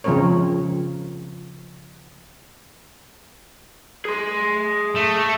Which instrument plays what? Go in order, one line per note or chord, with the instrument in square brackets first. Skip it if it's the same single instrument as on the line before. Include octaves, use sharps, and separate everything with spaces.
[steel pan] C#3 F3 G#3 C4 A#4 C#5
[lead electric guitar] G#4 C6
[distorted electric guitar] A3